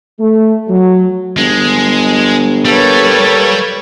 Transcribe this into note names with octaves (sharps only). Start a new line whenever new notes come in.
A3
F#3
G1 G#3
G3 A#3 G4 A4 B4 C#5